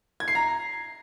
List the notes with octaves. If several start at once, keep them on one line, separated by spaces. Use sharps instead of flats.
G#6
C7
A#5